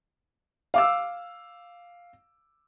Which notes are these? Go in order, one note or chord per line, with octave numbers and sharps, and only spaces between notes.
F5 D6 E6